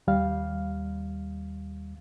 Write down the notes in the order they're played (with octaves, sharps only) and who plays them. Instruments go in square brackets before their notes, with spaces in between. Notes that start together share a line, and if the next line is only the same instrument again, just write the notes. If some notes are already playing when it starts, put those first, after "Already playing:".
[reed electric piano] D#2 G3 F5